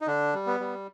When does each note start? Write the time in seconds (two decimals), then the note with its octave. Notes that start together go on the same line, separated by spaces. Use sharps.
0.01 D#4
0.07 D3 D4
0.34 G3
0.47 B3
0.60 G3